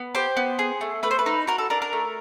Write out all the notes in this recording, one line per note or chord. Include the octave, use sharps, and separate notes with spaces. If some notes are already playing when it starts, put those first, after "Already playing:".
Already playing: B3
G4 C5
B3
G#4
A3
A3 B4
C5
B4
D#4
F#4 A#4
A4
D4 A#4
A#4
A3